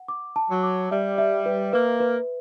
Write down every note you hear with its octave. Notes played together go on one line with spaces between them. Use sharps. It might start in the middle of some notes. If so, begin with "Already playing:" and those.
Already playing: F#5
D6
A5
F#3
D6
G3 E5
E5
B4
A#3 B4
B4